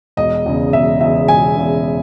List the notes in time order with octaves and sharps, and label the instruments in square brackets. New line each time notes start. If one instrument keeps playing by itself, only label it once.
[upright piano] E1 D#5
E2 C#3
E1 E5
E2 C#3 E5
E1 G#5
E2 C#3